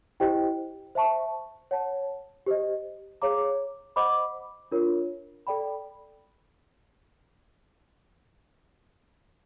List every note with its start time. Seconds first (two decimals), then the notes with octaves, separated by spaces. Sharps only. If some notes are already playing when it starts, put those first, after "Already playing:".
0.20 E4 G4 C5 D#5 G5
0.95 C5 E5 A5 C#6
1.71 C#5 F#5 A5
2.46 G4 C5 D#5
3.22 G#4 C#5 F5 A#5 D6
3.96 C5 D#5 F#5 B5 D6
4.72 D4 F4 A#4 C#5
5.47 A4 D5 G5 B5